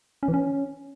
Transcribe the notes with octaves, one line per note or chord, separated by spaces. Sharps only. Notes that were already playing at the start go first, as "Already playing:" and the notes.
C#4
E3
C#4